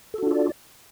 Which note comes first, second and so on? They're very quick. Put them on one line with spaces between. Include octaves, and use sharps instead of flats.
A4 F#4 D4 F4 D5